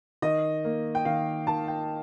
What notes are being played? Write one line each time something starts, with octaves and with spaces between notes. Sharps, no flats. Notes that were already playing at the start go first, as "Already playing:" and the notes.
D#3 D#5
A#3
G5
D#3 F5
D#3 A5
G5